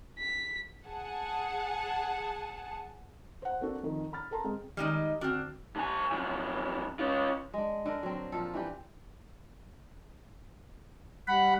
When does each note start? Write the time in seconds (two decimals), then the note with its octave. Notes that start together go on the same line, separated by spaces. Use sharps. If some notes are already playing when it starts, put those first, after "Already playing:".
0.19 B6
0.87 G#4 F#5 A5
3.42 C5 F#5
3.61 A#3 C4 D4 F#4 A4
3.83 F2 D#3
4.13 B5 F6 A6
4.31 A4 A#4 A5 A#5 C6
4.44 G#3 C4
4.77 D#3 G3 G#3 D#4 F6
5.21 D3 C4 D4 F#4 F6
5.76 D3 G#5
6.12 F#2 F3
6.99 C#4 F4
7.54 G#3 D4
7.86 D3 D4 A#4
8.03 F#3 C4
8.32 A#2 F3 A4
8.54 E3 D4 G4 B4
11.28 G3 F#5 B5